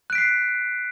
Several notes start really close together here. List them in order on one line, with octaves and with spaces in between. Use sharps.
F#6 D7 B6 C7